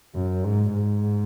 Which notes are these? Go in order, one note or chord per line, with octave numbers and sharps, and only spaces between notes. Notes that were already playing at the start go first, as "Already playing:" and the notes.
F#2
G#2
G#2